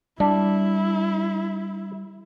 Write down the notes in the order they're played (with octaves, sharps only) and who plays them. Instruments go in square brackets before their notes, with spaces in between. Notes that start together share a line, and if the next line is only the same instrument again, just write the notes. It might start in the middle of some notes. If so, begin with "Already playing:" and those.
[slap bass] G3 [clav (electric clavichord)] D4 [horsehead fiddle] E4